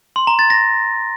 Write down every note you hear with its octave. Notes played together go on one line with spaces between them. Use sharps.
C6
A#5
A6
A#6